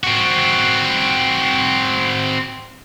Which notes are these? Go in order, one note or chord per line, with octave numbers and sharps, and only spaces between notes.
C4 F#4